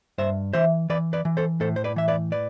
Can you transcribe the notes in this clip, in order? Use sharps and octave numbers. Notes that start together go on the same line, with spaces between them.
G2 C5 E5
E3 C5 E5
E3 B4 D5
B4 D5
E3
A4 C5
A2 A4 C5
C5
B4 D5
E3 E5
B4 D5
B4 D5